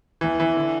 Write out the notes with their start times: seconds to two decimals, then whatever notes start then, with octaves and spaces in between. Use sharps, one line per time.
0.21 E2 E3
0.40 E3
0.56 D3